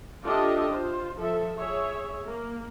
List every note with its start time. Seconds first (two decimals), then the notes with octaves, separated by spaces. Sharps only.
0.24 D4 F4 G4 A4 D#5 E5
0.70 F4 C5
1.20 F3 A4 E5
1.56 G#4 C#5 E5
2.26 A#3